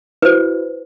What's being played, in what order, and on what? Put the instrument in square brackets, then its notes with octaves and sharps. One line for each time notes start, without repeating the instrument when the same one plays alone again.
[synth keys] E4 F#4 [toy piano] B4 C5